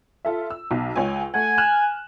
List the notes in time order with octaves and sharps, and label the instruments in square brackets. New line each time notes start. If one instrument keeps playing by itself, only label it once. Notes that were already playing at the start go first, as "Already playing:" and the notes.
[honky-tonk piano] F4 A4 E5
E6
B1
C#2 C#5 G#5
[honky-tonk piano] A3 F#5 [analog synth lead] G#5
[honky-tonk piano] F6 F#6 E7